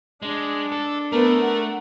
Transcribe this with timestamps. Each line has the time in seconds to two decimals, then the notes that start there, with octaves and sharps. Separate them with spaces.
0.22 G#3 D4
0.72 A4
1.12 A3 B3 A#4
1.42 F#5